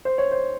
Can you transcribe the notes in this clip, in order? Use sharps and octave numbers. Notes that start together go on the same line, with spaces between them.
C5
C#5
C5